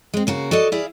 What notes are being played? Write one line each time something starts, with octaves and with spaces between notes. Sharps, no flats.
G#3 C4
C#3 A#3 F#4
F#4 A4 D5 D#5
E4 G#4 D5 F5